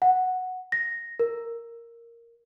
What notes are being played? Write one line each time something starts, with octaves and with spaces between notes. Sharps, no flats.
F#5
A#6
A#4